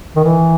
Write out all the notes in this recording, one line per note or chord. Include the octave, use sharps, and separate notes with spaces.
D#3
E3